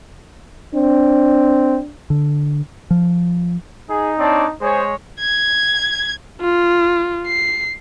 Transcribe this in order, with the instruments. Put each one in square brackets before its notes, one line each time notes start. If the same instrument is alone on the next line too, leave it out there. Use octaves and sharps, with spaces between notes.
[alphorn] C4 [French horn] D4
[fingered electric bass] D3
F3
[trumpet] D#4 [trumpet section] G#4
[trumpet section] C4 A5 [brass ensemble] D4 C#5 D5
[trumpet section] G#3 C#5 [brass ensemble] G#4 C5
[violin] G#6
[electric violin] F4
C7